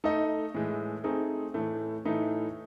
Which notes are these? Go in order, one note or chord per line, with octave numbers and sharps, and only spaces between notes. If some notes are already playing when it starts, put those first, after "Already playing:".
A3 D#4 A4 D#5
A2 E3 G#3
A3 C4 D#4 G#4
A2 E3 A3
A2 E3 A3 D#4